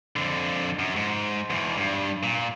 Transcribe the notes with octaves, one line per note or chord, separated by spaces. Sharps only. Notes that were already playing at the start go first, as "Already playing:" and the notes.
F2 D3
F#2
G#2
E2 B2
G2
A#2